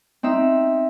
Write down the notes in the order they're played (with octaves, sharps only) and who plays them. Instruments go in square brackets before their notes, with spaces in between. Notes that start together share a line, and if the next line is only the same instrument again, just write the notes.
[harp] C4 D#4 E5